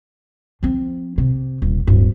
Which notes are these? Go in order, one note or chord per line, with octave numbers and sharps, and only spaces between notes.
F3 C4
C3
D#1
D1 G2